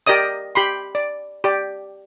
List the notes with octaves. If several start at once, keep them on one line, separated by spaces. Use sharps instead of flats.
G4 A#4 D5 D#5 D#6
G4 B5 C6
D5
G4 D5